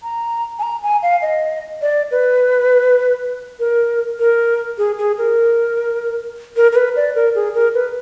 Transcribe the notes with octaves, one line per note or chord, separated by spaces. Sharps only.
A#5
G#5
A#5
G#5
F5
D#5
D5
B4
A#4
A#4
G#4
G#4
A#4
A#4
A#4
B4
D5
A#4
G#4
A#4
B4